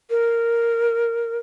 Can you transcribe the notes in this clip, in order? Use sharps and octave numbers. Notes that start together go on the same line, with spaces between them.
A#4